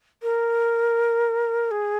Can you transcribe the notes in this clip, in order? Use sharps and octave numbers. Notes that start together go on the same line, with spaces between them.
A#4
G#4